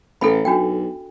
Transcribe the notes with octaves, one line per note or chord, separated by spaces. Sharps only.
A1 A4 B5
B1 D4 F#4 G5